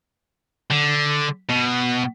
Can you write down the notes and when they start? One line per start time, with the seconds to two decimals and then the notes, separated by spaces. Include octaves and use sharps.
0.71 D3
1.49 B2